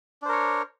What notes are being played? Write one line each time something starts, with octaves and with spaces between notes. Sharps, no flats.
D4 A#4 C5 C#5